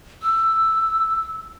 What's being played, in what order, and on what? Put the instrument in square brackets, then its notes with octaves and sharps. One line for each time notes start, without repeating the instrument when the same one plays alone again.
[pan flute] E6